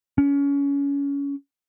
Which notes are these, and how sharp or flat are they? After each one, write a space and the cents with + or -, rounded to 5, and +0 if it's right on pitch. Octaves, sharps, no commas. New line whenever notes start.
C#4 +25